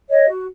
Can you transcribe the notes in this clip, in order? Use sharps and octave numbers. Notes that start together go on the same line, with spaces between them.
C#5 D#5
F#4